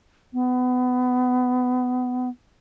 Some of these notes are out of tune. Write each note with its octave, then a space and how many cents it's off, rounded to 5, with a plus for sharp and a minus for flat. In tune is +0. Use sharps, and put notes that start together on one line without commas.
B3 +25